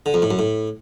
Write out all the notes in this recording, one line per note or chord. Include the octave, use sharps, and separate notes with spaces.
D3
F2
A2
F#2
A2